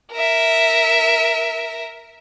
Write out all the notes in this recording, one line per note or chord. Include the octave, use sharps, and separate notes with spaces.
A#4 E5